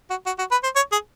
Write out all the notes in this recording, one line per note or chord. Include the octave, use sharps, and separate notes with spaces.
F#4
F#4
F#4
B4
C5
C#5
G#4